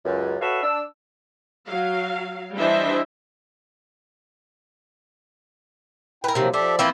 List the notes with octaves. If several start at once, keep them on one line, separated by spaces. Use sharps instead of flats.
C#2 F#2
F#4 A4 B4 C#5 E5 F5
D4 E6
F#3 F5
E3 G3 D4 C5 D#5 E5
E4 A#4 B4 G5 G#5
C3 D#3 F3 F#3 A#3
F3 C4 G4 A4 D5 E5
E3 F3 A#3 C4 E4